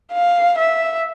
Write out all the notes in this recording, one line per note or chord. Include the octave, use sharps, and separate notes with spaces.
F5
E5